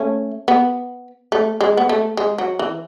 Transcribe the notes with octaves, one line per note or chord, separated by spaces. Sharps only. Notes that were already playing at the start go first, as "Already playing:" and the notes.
Already playing: A3 C#4
B3
A3
G#3
B3
A3
G#3
F#3
E3